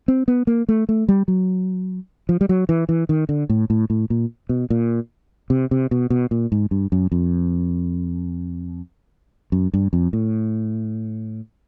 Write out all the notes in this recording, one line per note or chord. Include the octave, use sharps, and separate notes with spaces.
C4
B3
A#3
A3
A3
G3
F#3
F3
G3
F#3
E3
E3
D#3
D3
A2
A2
A2
A#2
B2
A#2
C3
C3
B2
B2
A#2
G#2
G2
F#2
F2
F#2
G2
F2
A2